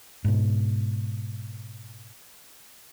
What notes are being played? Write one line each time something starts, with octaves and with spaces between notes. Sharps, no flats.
G#2 B2